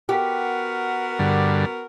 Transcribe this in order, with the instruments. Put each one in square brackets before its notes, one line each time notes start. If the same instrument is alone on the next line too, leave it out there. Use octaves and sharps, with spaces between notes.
[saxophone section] B3 F#4 A#4 [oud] G4
[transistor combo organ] G2 D3